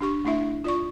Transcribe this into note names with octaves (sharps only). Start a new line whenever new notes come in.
D4 G4 C#6
A3 D4 E4 E5
F4 D5 C#6